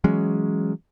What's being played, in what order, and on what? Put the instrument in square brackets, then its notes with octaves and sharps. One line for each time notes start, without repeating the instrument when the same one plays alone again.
[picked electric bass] E3 F#3 G#3 C#4